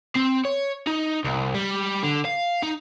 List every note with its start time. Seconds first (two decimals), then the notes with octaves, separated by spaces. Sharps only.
0.16 C4
0.45 C#5
0.87 D#4
1.24 C2
1.54 G3
2.03 D3
2.25 F5
2.63 D#4